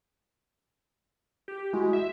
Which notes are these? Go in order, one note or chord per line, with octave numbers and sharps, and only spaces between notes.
G4
G#3 E4 F#4
E5